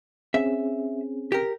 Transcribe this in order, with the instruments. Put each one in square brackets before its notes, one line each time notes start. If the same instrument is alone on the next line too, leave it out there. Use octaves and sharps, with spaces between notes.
[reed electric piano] C4 C#4 G#4 [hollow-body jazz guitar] E5
[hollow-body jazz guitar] G4 A#4